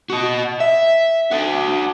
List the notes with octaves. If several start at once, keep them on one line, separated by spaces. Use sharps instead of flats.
F#4 D#5
E5
F#4 A4